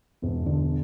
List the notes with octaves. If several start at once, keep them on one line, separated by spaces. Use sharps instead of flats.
E1
D3